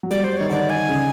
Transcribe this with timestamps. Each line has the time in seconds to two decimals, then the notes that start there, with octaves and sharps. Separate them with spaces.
0.03 F#3
0.11 G3 D5
0.24 C5
0.37 D#3 C#5
0.50 D3 D5
0.70 G#5
0.89 C#3